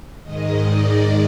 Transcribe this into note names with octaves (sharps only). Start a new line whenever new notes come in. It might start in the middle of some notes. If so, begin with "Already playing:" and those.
G#2 D#3 G#3 D#5
D5